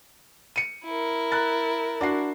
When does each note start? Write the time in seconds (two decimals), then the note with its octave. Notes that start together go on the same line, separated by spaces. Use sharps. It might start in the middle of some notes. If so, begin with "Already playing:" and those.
0.56 C#7 D#7
0.85 E4 A#4
1.32 A#5 F#6 A6
2.01 D4 F#4 C7